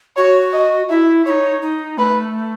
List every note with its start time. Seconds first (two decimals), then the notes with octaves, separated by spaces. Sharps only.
0.16 F#4 C#5
0.53 D#5
0.89 E4 E5
1.25 E4 C#5
1.30 D#4
1.62 D#4
1.98 A3 B4